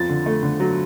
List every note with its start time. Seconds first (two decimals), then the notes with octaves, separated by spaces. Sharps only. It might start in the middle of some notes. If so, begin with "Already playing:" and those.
Already playing: F2 F4 A6
0.09 D3
0.26 A3
0.43 D3
0.60 F#3